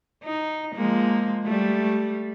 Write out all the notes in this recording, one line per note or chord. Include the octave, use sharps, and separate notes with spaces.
D#4
F3 G#3 A#3
G3 A3